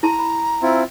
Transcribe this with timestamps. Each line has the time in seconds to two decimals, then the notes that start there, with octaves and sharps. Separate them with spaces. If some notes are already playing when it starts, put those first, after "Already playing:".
0.03 E4 A5 A#5 C6
0.19 B5
0.62 C4 E4 F4